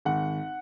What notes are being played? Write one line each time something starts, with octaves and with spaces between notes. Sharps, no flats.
G#1 F#5